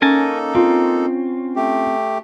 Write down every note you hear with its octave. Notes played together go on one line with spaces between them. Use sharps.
A#3 C#4 D#4 A4 A#4 G#5 A5
C4 F4
A3 G4